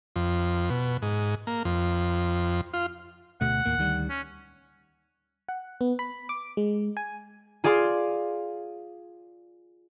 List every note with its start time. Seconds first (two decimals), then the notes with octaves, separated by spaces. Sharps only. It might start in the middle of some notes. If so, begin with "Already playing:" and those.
0.16 F2
0.70 B2
1.02 G#2
1.47 A#3
1.65 F2
2.74 F4
3.41 D2 B2 A3 F#5
3.65 D#2 A2 A#3
3.78 D2 D#3 G3
4.09 C#4
5.49 F#5
5.81 B3
5.99 B5
6.29 D6
6.57 G#3
6.97 G#5
7.64 F4 G#4 D5 F5 G#5 C6